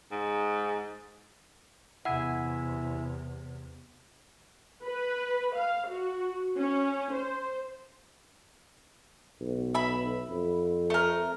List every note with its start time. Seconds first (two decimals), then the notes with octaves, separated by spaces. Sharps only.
0.11 G#2
2.05 E2 C3 E4 E5 F#5 G#5
4.83 B4
5.56 F5
5.89 F#4
6.57 C#4
7.13 C5
9.41 B1
9.74 E5 B5
10.30 F2
10.90 A3 A#4